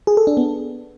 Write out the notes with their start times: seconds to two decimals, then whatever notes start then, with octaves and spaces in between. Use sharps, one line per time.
0.07 G#4
0.17 A4
0.27 D4
0.37 B3